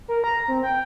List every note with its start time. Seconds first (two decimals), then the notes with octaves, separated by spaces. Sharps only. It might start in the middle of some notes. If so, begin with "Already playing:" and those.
0.08 A#4
0.24 A#5
0.48 C4
0.63 G5